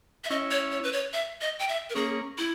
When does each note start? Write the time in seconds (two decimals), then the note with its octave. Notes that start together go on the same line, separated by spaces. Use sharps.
0.24 E5
0.30 C#4 E4 D#5
0.51 C#5
0.71 C#5
0.83 B4
0.93 C#5
1.13 E5
1.41 D#5
1.59 G5
1.68 E5
1.90 A#4
1.95 A#3 C#4 G#4
2.38 E4